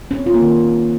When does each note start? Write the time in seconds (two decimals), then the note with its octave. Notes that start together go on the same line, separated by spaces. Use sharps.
0.11 C#4
0.19 C4
0.26 F4
0.34 A#3
0.42 D#3